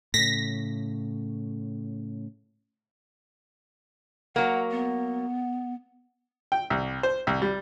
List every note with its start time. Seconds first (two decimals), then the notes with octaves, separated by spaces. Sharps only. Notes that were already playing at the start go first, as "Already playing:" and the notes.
0.14 A2 C#3 A#6 B6
4.36 F#3 A#3 F#5
4.71 B3
6.52 G5
6.70 C2
7.03 C5
7.27 C2
7.42 G3